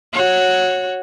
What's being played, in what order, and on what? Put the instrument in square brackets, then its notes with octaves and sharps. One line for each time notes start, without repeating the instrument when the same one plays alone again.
[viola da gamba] F#4 C#5